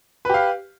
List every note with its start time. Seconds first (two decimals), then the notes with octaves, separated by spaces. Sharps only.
0.25 B4
0.30 G4
0.34 F5